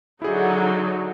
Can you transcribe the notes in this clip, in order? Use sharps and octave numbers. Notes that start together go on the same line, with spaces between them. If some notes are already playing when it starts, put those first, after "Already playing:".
D3 F#3 D#4 E4 G#4